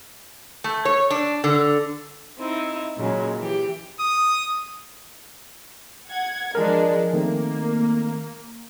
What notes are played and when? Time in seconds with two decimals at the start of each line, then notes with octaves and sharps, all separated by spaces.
0.64 A3
0.85 C#5
1.11 D4
1.44 D3
2.38 C4 D#4 E4
2.96 A#2 C#3 F#3 G#3
3.38 E3 G4
4.00 D#6
6.09 F#5 G#6
6.55 F3 G#3 D4 A#4
7.13 D#3 A3 A#3 C4